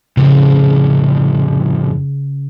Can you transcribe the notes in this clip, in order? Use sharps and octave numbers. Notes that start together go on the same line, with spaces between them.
F2 A2 C#3